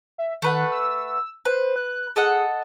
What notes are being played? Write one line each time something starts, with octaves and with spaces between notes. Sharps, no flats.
E5
D#3 A3 B4 F#5
E6
B4 C5
F#6
G#4 A4 D#5 F#5